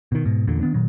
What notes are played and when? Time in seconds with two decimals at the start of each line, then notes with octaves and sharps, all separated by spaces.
0.12 B2 D#3
0.25 G#2 B2
0.47 A1 E2 A#2 D3
0.61 D#3 B3 D4
0.74 A#2 D#3 F#3